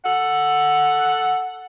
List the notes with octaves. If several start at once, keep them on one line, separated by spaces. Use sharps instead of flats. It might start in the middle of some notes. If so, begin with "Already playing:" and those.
A4 F#5